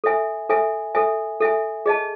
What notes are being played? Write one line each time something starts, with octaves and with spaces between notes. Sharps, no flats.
A4 E5 G#5
A4 E5 G#5
A4 E5 G#5
A4 E5 G#5
G#4 D#5 A5